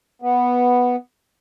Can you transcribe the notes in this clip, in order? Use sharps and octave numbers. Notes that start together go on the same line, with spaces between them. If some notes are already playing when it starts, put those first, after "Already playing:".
B3